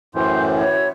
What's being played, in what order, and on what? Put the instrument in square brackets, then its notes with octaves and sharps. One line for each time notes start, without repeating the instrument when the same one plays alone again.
[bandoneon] F#2 A2 E3 [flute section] C5 C6 G6
[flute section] E4 F#4 C#5